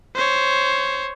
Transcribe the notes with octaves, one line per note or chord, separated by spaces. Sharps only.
C5 C#5